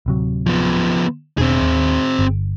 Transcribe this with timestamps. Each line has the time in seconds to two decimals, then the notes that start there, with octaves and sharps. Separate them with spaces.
0.06 D1 C3 F#3
0.47 F3 B3
1.38 E1 B2 C4 D4 G#4
1.61 D#2
2.19 G1